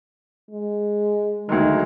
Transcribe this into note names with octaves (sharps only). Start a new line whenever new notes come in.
G#3
D2 D#3 F#3 G#3